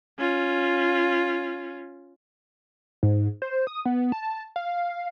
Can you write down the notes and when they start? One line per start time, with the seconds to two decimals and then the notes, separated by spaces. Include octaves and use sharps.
0.19 C#4 F4
3.03 G#2
3.42 C5
3.67 D#6
3.85 B3
4.12 A5
4.56 F5